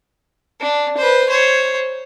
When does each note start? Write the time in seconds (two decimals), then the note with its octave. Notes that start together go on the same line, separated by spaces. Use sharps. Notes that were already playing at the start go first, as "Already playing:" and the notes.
0.60 D4
0.97 B4 C5
1.29 C5 C#5